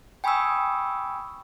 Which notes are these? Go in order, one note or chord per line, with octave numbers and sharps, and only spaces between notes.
G5 G#5 B5 C#6 D#6 E6